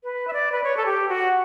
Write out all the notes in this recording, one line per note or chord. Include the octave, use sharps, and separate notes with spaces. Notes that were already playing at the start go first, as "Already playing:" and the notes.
B4
E5
D5
B4
C#5
A4
G4
F#4